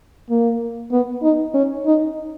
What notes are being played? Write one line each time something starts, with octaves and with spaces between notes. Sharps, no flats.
A#3
B3
D#4
C#4
D#4